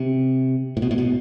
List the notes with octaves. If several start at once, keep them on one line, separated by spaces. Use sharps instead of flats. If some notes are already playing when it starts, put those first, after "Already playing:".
Already playing: C3
A2
B2
A2
B2